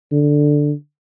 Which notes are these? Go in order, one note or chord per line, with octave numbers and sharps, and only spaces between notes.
D3